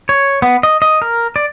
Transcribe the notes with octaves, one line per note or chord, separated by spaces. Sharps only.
C#5
B3
D#5
D#5
A#4
D5